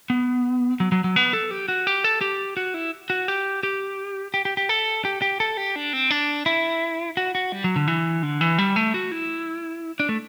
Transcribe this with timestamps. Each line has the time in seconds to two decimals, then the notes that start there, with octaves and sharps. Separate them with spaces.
0.10 B3
0.80 F#3
0.92 F#3
1.04 F#3
1.16 B3
1.33 A4
1.51 G4
1.68 F#4
1.87 G4
2.04 A4
2.21 G4
2.57 F#4
2.74 E4
3.10 F#4
3.28 G4
3.63 G4
4.34 G4
4.45 G4
4.57 G4
4.69 A4
5.05 G4
5.22 G4
5.40 A4
5.57 G4
5.76 D4
5.93 C4
6.10 D4
6.46 E4
7.17 F#4
7.35 F#4
7.52 G3
7.64 F#3
7.76 D3
7.88 E3
8.23 D3
8.41 E3
8.58 G3
8.76 A3
8.94 F#4
9.11 E4
10.00 D4
10.09 A3